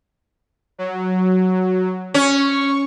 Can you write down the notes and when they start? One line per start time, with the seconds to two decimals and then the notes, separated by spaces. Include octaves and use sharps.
0.78 F#3
2.14 C#4 C#6